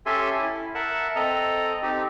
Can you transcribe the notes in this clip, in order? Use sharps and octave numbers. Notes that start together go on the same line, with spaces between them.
C#4 G4 A4 E5 G#5 C6
E4
A#4 E5 F#5 A5
C4 A4 D#5 A#5
C4 D#4 G4